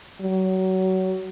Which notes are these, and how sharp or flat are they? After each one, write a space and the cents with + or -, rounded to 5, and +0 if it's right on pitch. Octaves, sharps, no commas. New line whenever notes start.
F#3 +25